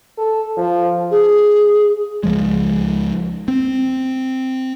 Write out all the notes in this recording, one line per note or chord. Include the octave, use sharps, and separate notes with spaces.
A4
F3
G#4
C#2 F3 G#3
C4